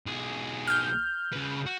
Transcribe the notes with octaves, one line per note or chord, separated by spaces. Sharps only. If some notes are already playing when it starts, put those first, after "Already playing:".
B1 G#4
F6 G6
C#3 B4
F#4